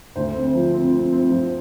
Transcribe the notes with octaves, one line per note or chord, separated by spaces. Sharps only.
D2 C5
C4
F3
C4
C4
C4
F3